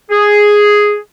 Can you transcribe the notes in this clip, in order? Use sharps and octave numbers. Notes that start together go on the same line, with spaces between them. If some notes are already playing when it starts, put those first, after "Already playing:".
G#4